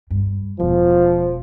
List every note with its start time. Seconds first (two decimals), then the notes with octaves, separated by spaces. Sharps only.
0.10 G2
0.60 E1 F3